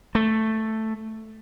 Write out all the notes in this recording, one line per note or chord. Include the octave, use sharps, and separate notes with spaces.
A3